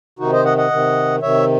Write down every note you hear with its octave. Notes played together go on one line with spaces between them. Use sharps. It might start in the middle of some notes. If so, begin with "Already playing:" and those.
C3 D#3 D#4 F#4
C5 D#5
D#5 F#5
D#5 F#5
C3 D#3
C3 D#3 C#5 E5